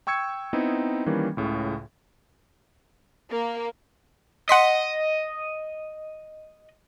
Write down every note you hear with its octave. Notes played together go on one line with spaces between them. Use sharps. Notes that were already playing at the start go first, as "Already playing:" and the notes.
G5 C#6 E6 G#6 C#7
B3 C4 D#4 E4
D#3 E3 G3 A#3 C#4
C#2 A2 C#3
A#3
D#5 F#5 C6 B6